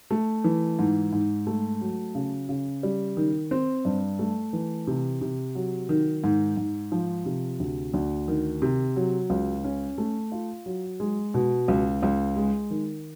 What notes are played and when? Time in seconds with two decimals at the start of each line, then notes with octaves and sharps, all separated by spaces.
0.11 A3
0.44 E3
0.79 G#2
1.13 G#2
1.47 A3
1.81 F#3
2.15 C#3
2.49 C#3
2.83 G3
3.17 D#3
3.51 C4
3.85 G2
4.19 A3
4.53 E3
4.87 C3
5.21 C3
5.55 F#3
5.89 D#3
6.24 G#2
6.57 G#2
6.92 F3
7.26 C3
7.60 D2
7.94 D2
8.28 D#3
8.62 C3
8.96 F#3
9.30 C#2
9.64 C#4
9.98 A3
10.32 F4
10.66 F#3
11.00 G#3
11.34 B2
11.68 C#2
12.03 C#2
12.36 G#3
12.70 D#3